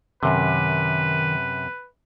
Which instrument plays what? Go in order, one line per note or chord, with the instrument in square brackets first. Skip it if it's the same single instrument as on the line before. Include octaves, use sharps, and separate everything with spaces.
[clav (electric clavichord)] F#2 C3 [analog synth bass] D#3 [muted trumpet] B4